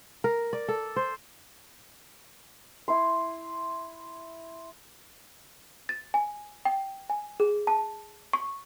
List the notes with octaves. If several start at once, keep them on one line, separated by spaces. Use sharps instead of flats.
A#4
D5
A4
C5
E4 C6
A6
G#5
G5
G#5
G#4
A5
C#6